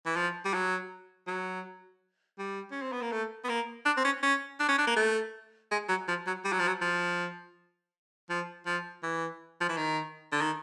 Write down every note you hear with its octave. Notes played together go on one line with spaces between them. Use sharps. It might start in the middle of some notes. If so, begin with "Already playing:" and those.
E3
F3
G3
F#3
F#3
G3
C#4
C4
B3
A#3
A3
B3
A#3
D4
C4
C#4
C#4
D4
C#4
D4
A#3
A3
G#3
F#3
F3
F#3
G3
F#3
F3
F#3
F3
F3
F3
E3
F3
E3
D#3
D3
D#3